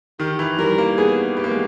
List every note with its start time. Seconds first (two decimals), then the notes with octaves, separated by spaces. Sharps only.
0.20 D#3 G4
0.39 E3
0.59 G3 A#4
0.78 A#3
0.98 B3 G#4
1.36 B3 G4
1.44 A#3
1.51 G#3